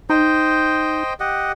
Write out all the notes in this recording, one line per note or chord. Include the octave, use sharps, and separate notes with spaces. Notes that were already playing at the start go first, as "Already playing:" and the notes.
D#4 C5 D#5 G5
G4 D#5 F#5